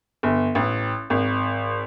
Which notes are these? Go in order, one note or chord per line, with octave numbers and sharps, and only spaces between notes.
G1
A1
G#1